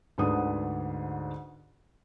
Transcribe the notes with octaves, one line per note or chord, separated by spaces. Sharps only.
D2 G#2 D3 B4 D#6